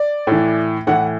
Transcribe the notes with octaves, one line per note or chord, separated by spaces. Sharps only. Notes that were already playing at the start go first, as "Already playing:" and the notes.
Already playing: D5
A2 E3
A2 E3 F#5